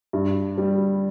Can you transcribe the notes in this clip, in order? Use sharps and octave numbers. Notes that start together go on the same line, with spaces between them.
G2
G3